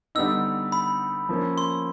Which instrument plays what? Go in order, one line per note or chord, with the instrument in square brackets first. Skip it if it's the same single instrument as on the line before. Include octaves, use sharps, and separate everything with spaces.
[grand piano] D3 G3 B3 D#4 [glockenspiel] E6
[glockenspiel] B5
[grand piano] F3 A#3 C#4
[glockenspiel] C6